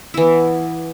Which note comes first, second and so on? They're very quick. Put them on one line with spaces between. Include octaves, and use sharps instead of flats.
E4 E3 B3